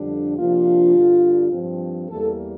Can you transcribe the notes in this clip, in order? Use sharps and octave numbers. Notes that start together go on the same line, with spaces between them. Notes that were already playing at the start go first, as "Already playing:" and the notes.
Already playing: F2 D3 G3 D4
C3 F3 A#3 D4 F4
G2 D3 G3
G2 F3 C4
E2 E3 G3 A#3 A4